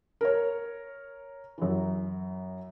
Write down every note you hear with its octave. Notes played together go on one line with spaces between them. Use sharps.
A#4 C#5
F#2 E3